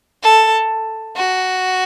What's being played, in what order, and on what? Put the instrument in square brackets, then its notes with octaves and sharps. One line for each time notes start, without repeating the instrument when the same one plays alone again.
[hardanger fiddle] A4
F#4